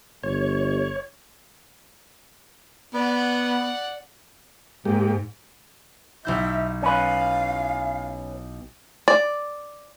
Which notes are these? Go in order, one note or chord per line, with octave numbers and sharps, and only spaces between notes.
G1 C#5
B3 D5 F#5
G#2 G#3 A#3 G4
B1 E4 E5 G6
C#4 B4 F5
D5